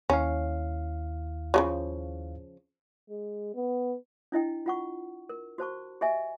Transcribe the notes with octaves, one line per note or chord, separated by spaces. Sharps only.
D#2 C#4 E4 F5
C#3 F3 F#3
G#3
B3
D4 E4 D#5 G5
F4 F#5 C#6
A#4
F#4 C5 A5 C#6
G4 D#5 E5 G#5